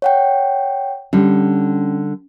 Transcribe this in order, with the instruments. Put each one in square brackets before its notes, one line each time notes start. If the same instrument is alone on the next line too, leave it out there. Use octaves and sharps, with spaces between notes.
[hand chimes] C#5 F#5 G5
[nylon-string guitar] D3 G3 [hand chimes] C#4